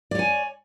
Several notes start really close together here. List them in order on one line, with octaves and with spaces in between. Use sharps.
D5 C#5 G#5